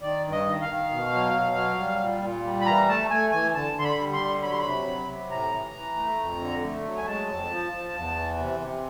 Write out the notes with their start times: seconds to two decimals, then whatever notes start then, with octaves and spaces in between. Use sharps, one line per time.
0.02 D#3 D5
0.24 G2
0.32 D#5
0.46 D#3
0.62 F5
0.68 D#3
0.91 B2
1.13 F#3
1.34 B2
1.56 F#3
1.79 G3
2.01 A#2
2.23 A#2
2.44 G3
2.61 B5
2.66 E3 A#5
2.88 A3 A5
3.11 A3 G#5
3.32 E3 G#5
3.54 D3 A5
3.77 D3 C6
3.84 B5
3.98 G3
4.13 C6
4.20 D3
4.42 F#3 B5
4.51 C6
4.58 B5
4.65 C3
4.87 F#3
5.08 C3
5.31 A2 A#5
5.52 E3
5.75 E3
5.96 A3
6.19 F2
6.40 D3
6.63 A3
6.85 F#3
6.98 G#5
7.07 G#3 A5
7.29 F2
7.50 F3
7.73 F3
7.94 E2
8.16 E3
8.38 C3
8.60 C3